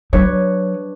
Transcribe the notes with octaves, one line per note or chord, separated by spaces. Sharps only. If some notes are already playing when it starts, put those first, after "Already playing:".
F#3 D4 B4 C#5